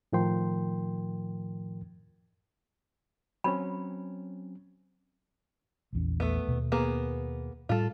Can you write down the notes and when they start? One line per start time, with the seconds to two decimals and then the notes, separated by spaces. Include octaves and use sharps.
0.12 A2 D#3 F3 A#4 G5 C6
3.44 F#3 C4 C#4 B5
5.93 A#1 E2 C#4
6.20 A3 B3
6.47 D#2 B2
6.72 A#3 B3 G#4
7.69 A2 G3 F4 A4